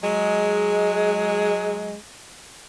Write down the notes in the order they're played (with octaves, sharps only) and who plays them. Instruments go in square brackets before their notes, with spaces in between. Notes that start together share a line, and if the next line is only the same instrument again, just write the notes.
[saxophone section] F#3 G#3